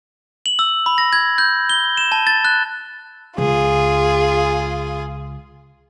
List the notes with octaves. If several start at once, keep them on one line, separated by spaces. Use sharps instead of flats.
F#7
E6
B5
A#6
G#6
G6
G7
E7
A5
A6
F#6
C#2 F4 G#4